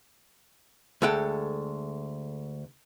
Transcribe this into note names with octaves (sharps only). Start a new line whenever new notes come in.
D2 G#3 A4 F#5 G5